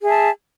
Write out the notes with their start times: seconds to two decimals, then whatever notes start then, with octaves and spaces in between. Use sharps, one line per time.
0.01 G#4
0.04 E5
0.07 A5